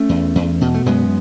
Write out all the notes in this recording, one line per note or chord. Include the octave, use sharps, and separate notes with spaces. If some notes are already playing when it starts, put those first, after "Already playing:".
Already playing: A3 C#4
E2
E2
B2
A3
F#2 G#3 B3